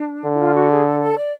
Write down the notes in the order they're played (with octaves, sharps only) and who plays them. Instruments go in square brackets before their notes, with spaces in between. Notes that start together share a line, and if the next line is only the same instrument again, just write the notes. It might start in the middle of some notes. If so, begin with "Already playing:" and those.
Already playing: [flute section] D4
[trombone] D3
[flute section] E4
F4
F#4
G#4
A4
A4
D5